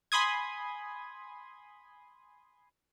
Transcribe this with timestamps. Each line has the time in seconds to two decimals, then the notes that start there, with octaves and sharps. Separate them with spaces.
0.12 G#5 B5 C6 D#6 G#6